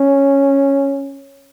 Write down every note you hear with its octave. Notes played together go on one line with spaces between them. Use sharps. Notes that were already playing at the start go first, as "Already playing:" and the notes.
Already playing: C#4